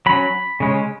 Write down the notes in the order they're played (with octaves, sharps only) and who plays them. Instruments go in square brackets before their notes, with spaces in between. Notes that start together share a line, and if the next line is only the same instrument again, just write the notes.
[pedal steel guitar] F#3 C#4 B5
C#3 G#3 C#4